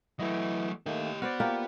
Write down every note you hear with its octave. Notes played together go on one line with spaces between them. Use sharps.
E3 F#3 A3 E4 D#5
D#3 A3 A#3 G4 D#5
B3 F#4 C5 D5 F6
A#3 F4 G4